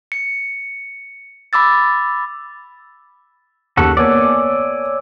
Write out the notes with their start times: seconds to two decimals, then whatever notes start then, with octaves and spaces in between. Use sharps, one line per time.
0.12 C#7
1.53 B5 D6 E6 A6
3.77 D#2 C#3 F#4 A4
3.97 A#3 B3 C#5 D5 G#5 E6